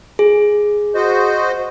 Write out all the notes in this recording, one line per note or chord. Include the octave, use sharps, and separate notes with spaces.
G#4
F#4 C5 D#5